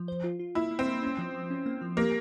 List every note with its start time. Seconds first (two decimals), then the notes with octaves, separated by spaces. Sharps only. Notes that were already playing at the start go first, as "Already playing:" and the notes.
Already playing: F3
0.08 C5
0.24 F4
0.39 F4
0.55 A#3 E4
0.71 A#3
0.79 C4
0.87 A#3
1.03 C#4
1.18 F3
1.34 F3
1.50 C#4
1.66 A#3
1.81 F3
1.97 A#3 G4